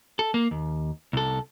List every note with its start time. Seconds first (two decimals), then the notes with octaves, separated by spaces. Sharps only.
0.19 A4
0.34 A#3
0.51 D#2
1.13 C2 A4